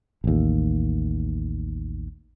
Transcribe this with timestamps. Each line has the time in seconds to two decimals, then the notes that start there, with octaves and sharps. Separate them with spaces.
0.24 A1 D#2